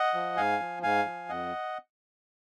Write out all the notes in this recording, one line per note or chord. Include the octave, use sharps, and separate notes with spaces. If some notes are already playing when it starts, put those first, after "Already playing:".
Already playing: D#5 F#5
F3
G#2 F5 G#5
F3
G#2 F5 G#5
F3
F2 D#5 F#5